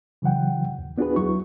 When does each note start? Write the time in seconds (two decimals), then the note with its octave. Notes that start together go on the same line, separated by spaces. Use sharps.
0.22 C#3 E3 F#3 F#5 G5
0.79 D#2
0.98 B3 D4 F4 F#4 G#4 B4
1.16 D#2 F#3 E4 C#6